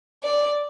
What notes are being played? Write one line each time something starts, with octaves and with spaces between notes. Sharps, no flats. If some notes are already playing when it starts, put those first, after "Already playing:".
D5